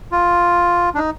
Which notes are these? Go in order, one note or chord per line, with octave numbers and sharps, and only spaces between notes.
F4
D4
D#4